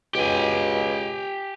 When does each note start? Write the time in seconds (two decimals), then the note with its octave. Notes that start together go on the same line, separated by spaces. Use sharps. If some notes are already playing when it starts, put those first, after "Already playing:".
0.15 C#2 B2 G4 G#5